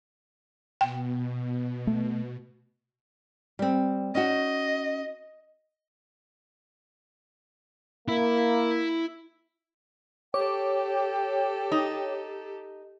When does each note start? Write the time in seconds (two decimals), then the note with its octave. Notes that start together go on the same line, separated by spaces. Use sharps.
0.81 B2 G5
1.87 A3
3.59 G3 C4
4.15 C#4 D#4 F#4 D#5
8.08 A#3 E4
10.34 G4 A4 C#5 G5 D6
11.72 D#4